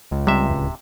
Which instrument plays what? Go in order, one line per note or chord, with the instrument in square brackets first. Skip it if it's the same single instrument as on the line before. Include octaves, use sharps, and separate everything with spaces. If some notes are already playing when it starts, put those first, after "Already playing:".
[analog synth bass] C#2
[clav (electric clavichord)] C3 E5 [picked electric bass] G3 C4
[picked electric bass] D1 E2